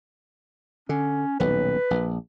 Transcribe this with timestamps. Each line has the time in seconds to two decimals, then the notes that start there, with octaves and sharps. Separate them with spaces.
0.89 D3 C#4
1.40 D#1 B1 B4
1.91 A#1